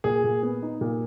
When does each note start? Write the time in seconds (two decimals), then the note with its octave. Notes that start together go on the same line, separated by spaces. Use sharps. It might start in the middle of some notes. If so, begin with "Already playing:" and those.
0.04 A#2 G#4
0.24 A#2
0.43 B3
0.63 D#4
0.81 A#2